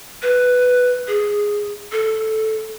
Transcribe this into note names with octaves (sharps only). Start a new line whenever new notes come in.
B4
G#4
A4